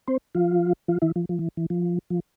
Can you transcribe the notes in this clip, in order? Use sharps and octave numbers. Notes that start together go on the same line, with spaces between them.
C4 C5
F3 F4
F3 F4
E3 E4
F3
F3
E3
E3
F3
F3